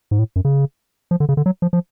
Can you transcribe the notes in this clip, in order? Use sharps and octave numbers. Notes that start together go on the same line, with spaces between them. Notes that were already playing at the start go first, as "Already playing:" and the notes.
G#2
A2
F#2
C#3
F3
D3
C#3
D3
F#3
F3
F3